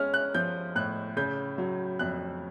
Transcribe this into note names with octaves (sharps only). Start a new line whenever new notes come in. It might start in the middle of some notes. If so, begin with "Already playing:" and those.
Already playing: G#3 C#4 F6
F#6
F3 G6
A2 F#6
C#3 G6
F#3
F2 F#6